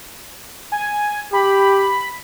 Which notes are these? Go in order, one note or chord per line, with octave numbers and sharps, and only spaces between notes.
G#5
G4 B5